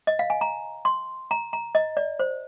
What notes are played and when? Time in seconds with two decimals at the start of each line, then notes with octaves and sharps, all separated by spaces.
0.07 D#5
0.19 F5
0.30 G#5
0.41 A#5
0.85 C6
1.31 A#5
1.53 A#5
1.75 D#5
1.97 D5
2.20 C5